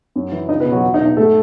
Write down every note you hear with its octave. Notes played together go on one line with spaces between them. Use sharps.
F#2
E3
C#2 D#4 D#5
B3 B4
B2
F#3 F#4
E2
D#4
B2
D#4
G#2 A3 A4